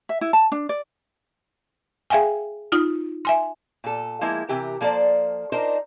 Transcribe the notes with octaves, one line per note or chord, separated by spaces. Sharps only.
E5
E4
A5
D4
D5
G#4 E5 F5 G5 G#5
D#4 F4 D#6 F6
E5 G#5 C6
A#2 A4
F3 G#3 A#3 B3 E4
C3 E3 G4 A#4
F3 A#3 A4 C5 D5
D4 D#4 F4 A#4 C5 D#5